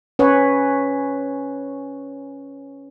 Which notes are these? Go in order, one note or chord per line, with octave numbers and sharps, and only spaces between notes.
C#4 B4 C#5